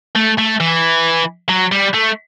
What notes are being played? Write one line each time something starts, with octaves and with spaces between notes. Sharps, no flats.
A3
A3
E3
F#3
G3
A3